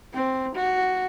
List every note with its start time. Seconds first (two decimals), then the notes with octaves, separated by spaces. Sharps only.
0.14 C4
0.55 F#4